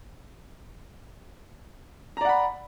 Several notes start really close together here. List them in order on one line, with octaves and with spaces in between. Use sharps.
A#5 D5 F#5 B5